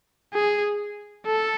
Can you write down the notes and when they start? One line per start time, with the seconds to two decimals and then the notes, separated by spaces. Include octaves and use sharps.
0.34 G#4
1.26 A4